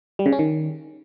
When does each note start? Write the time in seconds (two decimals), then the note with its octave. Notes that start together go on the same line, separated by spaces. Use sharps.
0.19 G3
0.26 C#3
0.32 C#4
0.39 D#3